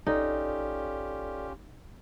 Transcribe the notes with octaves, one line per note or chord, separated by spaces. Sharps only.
A1 C#4 D#4 F4 G4 A4 D5